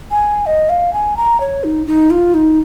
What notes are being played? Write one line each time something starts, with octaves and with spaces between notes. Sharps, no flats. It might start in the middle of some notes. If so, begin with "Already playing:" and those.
G#5
D#5
F5
G#5
A#5
C#5
D#4
D#4
F4
D#4